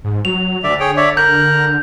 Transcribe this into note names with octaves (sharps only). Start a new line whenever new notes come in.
G#2
F#3 F7
D2 D3 D5 E5
G#4 C#5 G5
C#5 D5 E5
A#4 A#5 F#6 G6